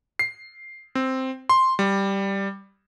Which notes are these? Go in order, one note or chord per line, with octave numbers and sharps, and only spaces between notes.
C7
C4
C6
G3